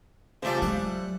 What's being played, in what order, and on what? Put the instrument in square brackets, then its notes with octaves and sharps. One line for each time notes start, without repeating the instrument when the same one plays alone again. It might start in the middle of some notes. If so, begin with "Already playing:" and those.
[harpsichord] C#3 F3 D5 [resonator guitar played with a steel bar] G3 A3 C5
[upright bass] F#3 G#3 [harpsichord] F#5